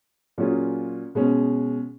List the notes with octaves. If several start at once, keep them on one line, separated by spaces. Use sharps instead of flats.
A#2 F#3 C#4 F4 G#4
B2 G#3 C#4